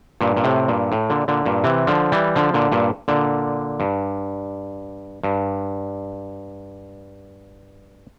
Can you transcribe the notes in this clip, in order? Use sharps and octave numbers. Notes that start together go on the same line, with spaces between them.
G2 A#2
A#2
A2 C3
G2 A#2
A2
A#2 D3
A#2 D3
G2 A#2
C3 E3
D3 F3
E3 G3
D3 F3
A#2 D3
G2 A#2
A#2 D3
G2
G2